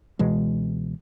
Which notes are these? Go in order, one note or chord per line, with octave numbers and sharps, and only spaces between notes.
C#2 B2 E3 G#3